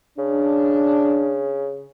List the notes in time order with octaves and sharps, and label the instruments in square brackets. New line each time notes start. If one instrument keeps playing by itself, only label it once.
[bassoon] C#3 [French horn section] D4